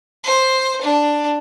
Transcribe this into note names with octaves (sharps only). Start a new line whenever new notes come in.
C5
D4